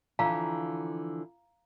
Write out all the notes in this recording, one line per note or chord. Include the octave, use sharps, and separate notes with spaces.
D3 E3 F3 F5 A#5